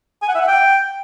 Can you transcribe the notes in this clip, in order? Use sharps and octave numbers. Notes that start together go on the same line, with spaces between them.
G#5
F#5
E5
F#5
G5